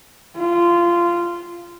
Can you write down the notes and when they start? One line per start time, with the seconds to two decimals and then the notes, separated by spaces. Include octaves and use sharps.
0.37 F4